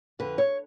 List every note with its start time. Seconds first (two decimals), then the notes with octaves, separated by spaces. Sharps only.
0.19 F2 D3 B4
0.38 C#5